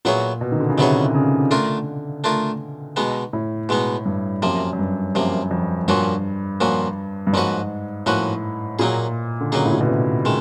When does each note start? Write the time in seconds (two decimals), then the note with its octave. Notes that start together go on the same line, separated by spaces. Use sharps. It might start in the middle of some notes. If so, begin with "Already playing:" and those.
0.05 A#2 F#3 B3 E4 G#4 C#5
0.41 B2
0.52 D#3
0.60 D3
0.70 C#3
0.78 C3 F#3 B3 E4 G#4 C#5
1.15 C#3
1.51 D3 A3 D4 F4 A#4
2.24 A3 D4 F4 A#4
2.96 B2 G#3 B3 D#4
3.33 A2
3.69 B2 G#3 B3 D#4
4.06 G2
4.42 F#2 C3 F3 A#3
4.73 F#2
4.79 G2
5.15 F#2 C3 F3 A#3
5.51 F2
5.88 G2 A#2 F3 A#3 C#4 F#4
6.61 A#2 F3 A#3 C#4 F#4
7.27 G2
7.33 G#2 F3 A#3 C#4 F#4 B4
8.06 A2 F3 A#3 C#4 F#4 B4
8.79 A#2 F#3 A#3 D#4 G#4
9.41 D3
9.52 C#3 F#3 A#3 D#4 G#4
9.66 A2
9.73 A#2
9.81 B2
9.89 C3
10.25 D#3 G#3